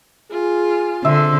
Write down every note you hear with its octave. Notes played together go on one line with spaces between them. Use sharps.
F4 G#4
D3 C4 E5